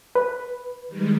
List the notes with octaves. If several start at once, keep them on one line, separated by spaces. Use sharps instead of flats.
B4
D#3 G3 G#3